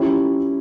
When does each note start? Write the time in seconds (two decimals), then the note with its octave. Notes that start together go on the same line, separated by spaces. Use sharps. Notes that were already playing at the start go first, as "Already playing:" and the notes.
Already playing: F3 C#4 E4 G4